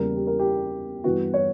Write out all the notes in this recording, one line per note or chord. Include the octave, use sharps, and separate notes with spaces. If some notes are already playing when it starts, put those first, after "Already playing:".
Already playing: E2 C#3 G3 A#3 A#4
G4
A#4
G4
G2 E3 B3 F#4
C#5